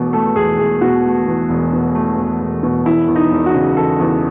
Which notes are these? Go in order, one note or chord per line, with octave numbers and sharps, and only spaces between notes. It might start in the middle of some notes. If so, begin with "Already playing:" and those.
Already playing: E1 E2 B2 A3
A3 A4
E2 G#4
E1 G#4
B2 F#4
A3
E2
E1
B2
A3
E2
E1
B2
E1 E4
E2
D#4
E1
F#4
C#3
E1 A4
E2